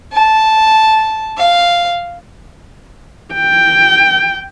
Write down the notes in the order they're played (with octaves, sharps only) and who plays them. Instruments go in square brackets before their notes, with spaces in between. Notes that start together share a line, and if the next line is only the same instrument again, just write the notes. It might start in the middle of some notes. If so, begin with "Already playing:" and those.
[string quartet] A5
F5
[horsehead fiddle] G5